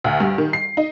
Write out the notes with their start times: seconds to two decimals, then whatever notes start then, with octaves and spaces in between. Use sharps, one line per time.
0.04 D2
0.20 G2
0.38 D#3
0.53 C7
0.77 D#4